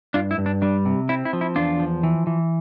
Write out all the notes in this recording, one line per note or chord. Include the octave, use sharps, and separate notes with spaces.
G2 D4 F4
E4
G2
D4
G3 D4
C3
C4 E4
E4
F3
E4
E2 D4 F4
F3
E3
E3